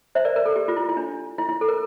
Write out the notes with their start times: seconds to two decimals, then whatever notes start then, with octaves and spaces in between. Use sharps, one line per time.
0.15 C5 E5
0.25 A#4 D5
0.36 A#4
0.46 A4
0.56 G4
0.68 F4
0.77 E4
0.89 E4
0.97 D4
1.38 E4
1.49 E4
1.61 A4
1.68 A#4